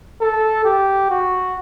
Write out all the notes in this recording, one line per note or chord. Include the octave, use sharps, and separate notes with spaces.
A4
G4
F#4